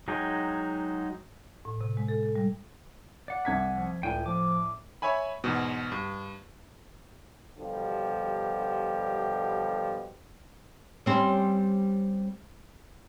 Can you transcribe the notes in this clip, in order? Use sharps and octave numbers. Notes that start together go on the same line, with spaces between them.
F#3 G#3 D#4 G5 G#5
A2
C3
G#3
A4
A4
G3
D5 F#5
C2 G#6 B6
F3
C#2 A2 D4 G5 G#5 D#7
F3 D6
C#5 E5 G#5 B5
E2 G#2 B2
G2
B2 D3 F3 G3 G4
G3 C4 C#4